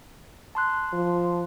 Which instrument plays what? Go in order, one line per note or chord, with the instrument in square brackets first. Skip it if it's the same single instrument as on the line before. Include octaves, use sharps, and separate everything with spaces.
[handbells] A5 C6 F#6
[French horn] F3